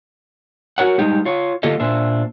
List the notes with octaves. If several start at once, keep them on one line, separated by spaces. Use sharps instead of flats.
F#4 A#4 C#5 F#5
G3 G#3 D#4 G4
F4 C#5
D3 A#3 F4 G4 A4 D#5
A#2 D4 C5 E5